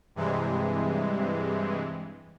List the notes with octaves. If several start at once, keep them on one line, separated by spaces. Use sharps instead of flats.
G2 C3 E3 G#3